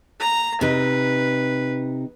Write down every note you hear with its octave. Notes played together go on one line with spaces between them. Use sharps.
A#5
C3 D#4 B4